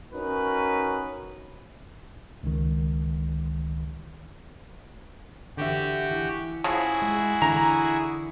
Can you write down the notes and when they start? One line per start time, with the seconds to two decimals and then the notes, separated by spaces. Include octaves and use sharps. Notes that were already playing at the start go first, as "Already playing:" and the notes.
0.12 C#4 D#4 F#4 A#4 B4
2.43 C#2 D#3
5.57 D3 E3 F#4 G4 E5
6.11 E3
6.64 C#3 F3 E4 F#4 G#4
7.02 G#3
7.42 D3 E3 A#5